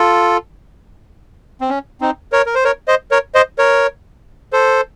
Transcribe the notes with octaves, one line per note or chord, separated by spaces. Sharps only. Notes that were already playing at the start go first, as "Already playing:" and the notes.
Already playing: F4 A4
C4
C#4
C4 D#4
A#4 C#5
A#4
C5
A#4 C#5
C5 D#5
A#4 C#5
C5 D#5
A#4 C#5
A4 C5